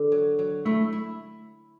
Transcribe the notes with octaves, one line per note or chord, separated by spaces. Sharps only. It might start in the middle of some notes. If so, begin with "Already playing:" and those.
Already playing: D3 D4
F#3
F#3
A3 E4
E4